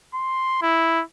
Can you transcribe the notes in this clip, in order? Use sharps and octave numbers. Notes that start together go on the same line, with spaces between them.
C6
E4